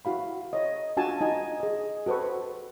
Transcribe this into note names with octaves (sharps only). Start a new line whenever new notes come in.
E4 F#4 F5 B5
C#5 D#5
D4 F4 F#4 G#5 A5
D#4 D#5 G#5
G#4 D#5
F#4 A4 B4 C5 C#6